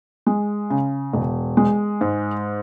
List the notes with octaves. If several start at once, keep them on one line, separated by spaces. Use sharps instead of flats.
G#3
C#3
E1
G#3
G#2